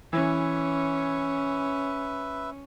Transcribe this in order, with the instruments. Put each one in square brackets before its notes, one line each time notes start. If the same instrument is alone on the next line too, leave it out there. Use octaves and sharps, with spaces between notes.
[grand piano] E3 [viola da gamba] C#4 [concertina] B4 E5